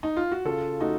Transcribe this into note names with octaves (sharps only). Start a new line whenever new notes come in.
D#4
F4
F#4
C#3 F4 A4
A3 D#4 F#4